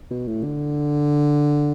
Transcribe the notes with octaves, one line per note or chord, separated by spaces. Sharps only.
B2
A2
D3